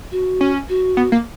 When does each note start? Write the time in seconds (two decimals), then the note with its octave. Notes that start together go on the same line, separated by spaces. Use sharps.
0.12 F#4
0.41 C#4
0.69 F#4
0.97 B3
1.12 A#3